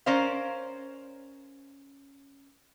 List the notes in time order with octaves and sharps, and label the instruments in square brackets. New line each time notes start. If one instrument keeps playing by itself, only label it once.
[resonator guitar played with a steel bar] C#4 A#4 C5 D5 F5